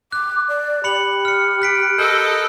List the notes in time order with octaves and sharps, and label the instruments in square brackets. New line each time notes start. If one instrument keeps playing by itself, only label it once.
[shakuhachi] D6 [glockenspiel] F#6
[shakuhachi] D5
[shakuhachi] G4 [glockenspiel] B5 C#7 F#7
[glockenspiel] F6 C#7
F#6 B6 D7
[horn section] A4 A#4 D#5 [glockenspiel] G6